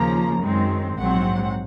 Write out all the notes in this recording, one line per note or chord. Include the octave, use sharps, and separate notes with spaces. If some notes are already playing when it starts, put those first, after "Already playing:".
Already playing: D#2 C#3 F3 A#3 A#5
F#2 D#3 G#3 C4
A#1 G#2 F#3 C4 F#5